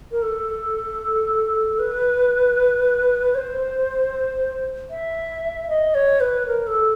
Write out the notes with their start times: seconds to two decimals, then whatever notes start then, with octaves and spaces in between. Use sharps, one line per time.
0.12 A#4
0.22 A4
1.79 B4
3.35 C#5
3.38 C5
4.90 E5
5.69 D#5
5.95 C#5
6.21 B4
6.47 A#4
6.67 A4